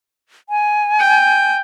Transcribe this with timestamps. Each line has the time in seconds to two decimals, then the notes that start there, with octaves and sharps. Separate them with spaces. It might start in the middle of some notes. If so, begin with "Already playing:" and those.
0.49 G#5
0.99 G5